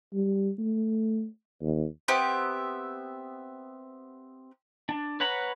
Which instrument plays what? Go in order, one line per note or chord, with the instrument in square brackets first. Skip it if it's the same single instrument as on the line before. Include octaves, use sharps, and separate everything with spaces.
[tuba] G3
A3
D#2
[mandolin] B3 C4 G4 E5
[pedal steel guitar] D4
B4 C#5 F#5 A#5 B5